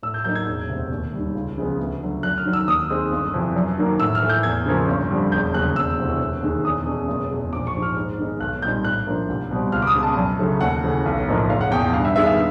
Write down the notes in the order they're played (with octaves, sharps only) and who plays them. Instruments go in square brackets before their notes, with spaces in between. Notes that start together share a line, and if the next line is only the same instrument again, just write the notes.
[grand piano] A2 E6
G6
F#3 A#3 D#4 G6
G#6
E1
D2 C3
D#2
D#3 G3
C#2
C#3 F3 G#3 B3
D2
D3 F#3
F#2 F#6
F6
D#3 F#3
E6
D#2 D#6
D#3 G#3 C4
G1
F2 C3 E3
F#2
D#3 F#3 A#3
A2 E6
F6
E3 A3
G6
E2 G#6
C#3 F3 A#3 C#4
G1
F2 D3 G3
E1 G6
D#2 C#3 F#3 F#6
E1 E6
D2 C3 E3
E1
D#2 D#3 G#3
E2 D#6
B2 G#3 C#4
F#1
E2 B2 G#3
A#1 D6
C#6
G#2 F3
F6
G#2
D#3 G#3 B3 D#4
B1 F#6
A#2 G3 C4 D#4 G6
A1 F#6
A2 F3 A#3 D4
C2
B2 G3 C4
C#2 F6
D6
D#6
B2 G#3 C#4
A5
F#2
C#3 F#3 A3 C#4
D#2 F#5
C#3 E3 A3
B1
A2 F3 A#3 D#4
F#1 F5
F#5
E2 B2 G5
G5
G2 F5
E5
D#3 G#3 B3 D4 E5
F5